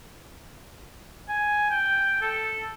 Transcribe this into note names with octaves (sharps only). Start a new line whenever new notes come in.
G#5
G5
A4